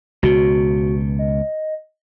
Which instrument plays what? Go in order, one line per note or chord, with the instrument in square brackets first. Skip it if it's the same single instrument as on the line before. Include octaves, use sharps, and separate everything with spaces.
[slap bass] C#2 B2 [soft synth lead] F#4
[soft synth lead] D#5